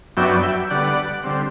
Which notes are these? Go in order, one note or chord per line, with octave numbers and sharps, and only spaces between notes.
F#2 F#3 B3 D4 E5 G5
E5 G5
D3 G3 B3 D5 F#5
D3 G3 C4